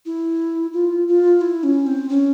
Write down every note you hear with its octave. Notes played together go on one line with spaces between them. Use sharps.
E4
F4
F4
E4
C#4
C4
C#4